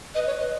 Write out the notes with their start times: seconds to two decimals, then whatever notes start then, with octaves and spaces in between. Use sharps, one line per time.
0.14 B4 D#5
0.27 C#5
0.38 D#5